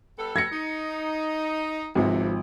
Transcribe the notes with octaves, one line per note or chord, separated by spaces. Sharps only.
G3 B3 A4
G#6 A#6 C#7
D#4
G#1 E2 A2 C3 F3